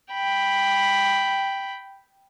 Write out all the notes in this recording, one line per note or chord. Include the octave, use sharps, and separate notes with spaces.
G5 B5